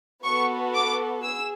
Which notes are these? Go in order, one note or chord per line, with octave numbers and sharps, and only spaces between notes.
B3 F#4 A4 C#6
D6
G#4 E6